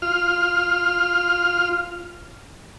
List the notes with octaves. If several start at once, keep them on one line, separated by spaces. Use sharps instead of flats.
F4 F6